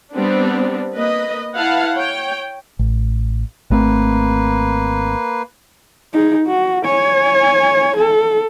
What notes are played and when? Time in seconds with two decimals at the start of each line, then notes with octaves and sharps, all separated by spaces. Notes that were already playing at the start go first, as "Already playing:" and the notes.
0.15 G3 B3 C4 D4
0.95 A#3 B4 D#5
1.56 E4 B4 F5 F#5 A5
1.94 C#5 G5
2.79 A1
3.70 G#1 A3 A#3 C4 B4
6.13 D#4 G#4
6.46 F#4
6.85 C#5 G#5
7.96 A4